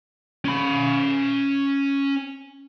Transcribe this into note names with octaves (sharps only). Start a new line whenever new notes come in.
C#4 B5